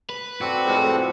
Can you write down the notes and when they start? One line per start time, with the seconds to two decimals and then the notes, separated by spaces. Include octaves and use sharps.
0.10 B4
0.41 C4 F#4 A4 D5
0.65 F2 A2 G#3